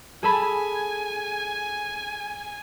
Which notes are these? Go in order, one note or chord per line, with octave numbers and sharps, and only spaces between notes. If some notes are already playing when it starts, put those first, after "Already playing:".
G#4 A4 G#5 B5